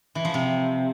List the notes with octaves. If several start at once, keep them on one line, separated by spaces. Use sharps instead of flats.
E3
F3
C3